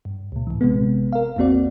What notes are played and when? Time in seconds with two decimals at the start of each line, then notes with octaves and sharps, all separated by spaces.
0.05 G2
0.32 C#2 A#2
0.47 A2 E3
0.61 A1 C3 G#3 B3
1.13 A#4 F5
1.36 A1 E2 A#3 C4 F#4 D5